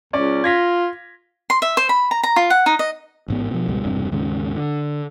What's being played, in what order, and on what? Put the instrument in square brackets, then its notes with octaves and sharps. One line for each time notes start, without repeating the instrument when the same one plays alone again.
[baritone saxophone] C#2 [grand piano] C#4 D5
[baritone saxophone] F4 [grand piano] G#6 A#6 B6
[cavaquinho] C6
E5
C5
B5
A#5
A#5
F4
F#5
D#4
D#5
[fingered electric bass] A1 G#2 B3
B2 F3
G#1 C#2 B2 G3
E1 G2 C3
D#2 G#2 C#3
D3